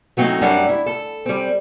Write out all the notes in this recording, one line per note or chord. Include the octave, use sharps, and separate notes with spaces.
F#3 A3 C4 D4 D#4
F#2 G3 C4 D4 F#5
E4
A4
G3 C4